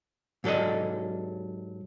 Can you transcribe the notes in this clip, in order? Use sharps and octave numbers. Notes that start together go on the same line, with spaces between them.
G#2 F#3 A4 D5 D#5